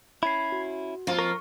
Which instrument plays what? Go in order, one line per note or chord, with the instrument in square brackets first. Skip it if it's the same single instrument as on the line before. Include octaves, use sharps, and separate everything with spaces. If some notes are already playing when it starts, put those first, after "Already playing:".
[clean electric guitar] C#4 E4 [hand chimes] B5 G#6 C7
[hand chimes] F#4
[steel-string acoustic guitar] F2 [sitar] A#3 F4
[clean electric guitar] A#4 [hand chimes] C#6